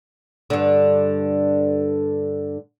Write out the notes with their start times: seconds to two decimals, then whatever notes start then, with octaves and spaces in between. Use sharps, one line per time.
0.50 G2 D3